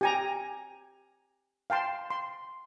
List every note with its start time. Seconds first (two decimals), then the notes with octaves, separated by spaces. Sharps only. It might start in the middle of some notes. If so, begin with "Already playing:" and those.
0.01 G4 G#5 A#5
1.70 F5 G5 A5 C6
2.10 C6